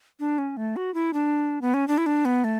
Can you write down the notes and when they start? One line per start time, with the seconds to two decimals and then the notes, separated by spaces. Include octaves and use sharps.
0.20 D4
0.38 C#4
0.57 A3
0.76 F#4
0.94 E4
1.13 D4
1.62 B3
1.74 C#4
1.88 D4
1.98 E4
2.06 D4
2.25 B3
2.44 A3